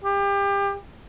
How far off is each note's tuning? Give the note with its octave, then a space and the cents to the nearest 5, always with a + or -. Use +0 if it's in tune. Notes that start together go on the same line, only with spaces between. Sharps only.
G4 +30